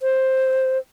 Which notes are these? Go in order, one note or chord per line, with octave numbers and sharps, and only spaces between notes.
C5